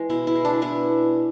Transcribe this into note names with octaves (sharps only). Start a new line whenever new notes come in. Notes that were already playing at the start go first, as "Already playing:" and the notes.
Already playing: E3 G#3
B2 E4
E4
G#3
D4
B3 E4